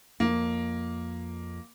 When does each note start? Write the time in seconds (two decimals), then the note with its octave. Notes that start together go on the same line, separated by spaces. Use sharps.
0.20 F2 A#3